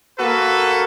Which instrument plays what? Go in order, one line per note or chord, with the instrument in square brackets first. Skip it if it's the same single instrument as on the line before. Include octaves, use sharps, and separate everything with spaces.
[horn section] A#3 F#4 A4 B4